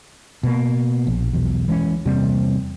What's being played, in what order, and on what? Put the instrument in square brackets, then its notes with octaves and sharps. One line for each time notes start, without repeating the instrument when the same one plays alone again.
[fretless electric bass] B2 A#3
A#1
B1 E2
E3 G#3 B3 C#4
E2 C3 G3 A#3